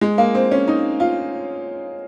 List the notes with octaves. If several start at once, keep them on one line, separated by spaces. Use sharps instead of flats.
G#3
A#3
C4
C#4
D#4
F4